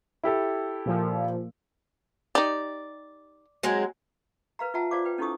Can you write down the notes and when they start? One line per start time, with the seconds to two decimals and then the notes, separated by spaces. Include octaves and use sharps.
0.23 E4 G4 A4
0.86 A#2 F3
2.35 D#4 G4 D5
3.63 F#3 G#3 C4
4.59 A#4 B4 F5 A#5
4.74 F4 E5 F#5 A5 A#5
4.91 F4 C5 D5 F5 D6
5.05 B4 G5
5.18 C#4 D#4 E4 A4 C#6 D#6